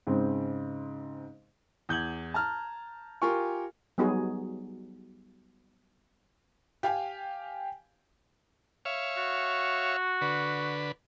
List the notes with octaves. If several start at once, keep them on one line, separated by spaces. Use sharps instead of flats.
G#2 C#3 C4
E2 G6 G#6 F#7
A5 A#5 F6
F4 G4 A#4 G#5 C#6
F#3 G3 B3 D#4 F#4 G#4
G4 F5 G5 G#5
C#5 E5 F5
F#4
D3 B4